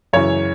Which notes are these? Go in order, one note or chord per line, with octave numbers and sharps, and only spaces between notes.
F#2 C#3 E3 C#5